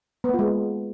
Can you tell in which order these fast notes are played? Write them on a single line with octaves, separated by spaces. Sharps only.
B3 A#3 F4 G#3